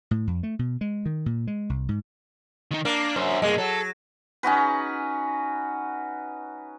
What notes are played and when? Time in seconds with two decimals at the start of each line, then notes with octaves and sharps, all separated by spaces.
0.11 A2
0.27 F2
0.43 A3
0.59 B2
0.81 G#3
1.06 D#3
1.26 A#2
1.47 G#3
1.70 C2
1.89 G#2
2.71 D#3 D#4
2.85 A#3 D4
3.16 F#2 D4 C5
3.42 G2 G#3 A#3
3.58 F#3 A4
4.43 C#4 D#4 F#4 B4